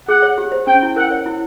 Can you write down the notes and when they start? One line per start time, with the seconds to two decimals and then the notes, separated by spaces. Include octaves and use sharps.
0.08 G#4 F#5
0.22 C#5
0.38 G4
0.52 C5
0.67 C#4 G5
0.82 E4
0.96 A#4 F#5
1.11 C#5
1.26 E4